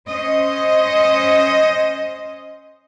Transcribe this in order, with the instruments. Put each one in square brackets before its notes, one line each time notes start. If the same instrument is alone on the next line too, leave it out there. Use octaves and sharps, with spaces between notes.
[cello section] C#4 C5 D#5